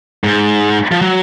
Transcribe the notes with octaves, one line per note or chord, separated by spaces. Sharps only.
G#2
F3
F#3